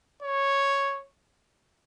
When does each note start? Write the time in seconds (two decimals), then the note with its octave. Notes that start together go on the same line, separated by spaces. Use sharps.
0.23 C#5